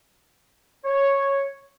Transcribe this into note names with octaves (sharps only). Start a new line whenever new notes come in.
C#5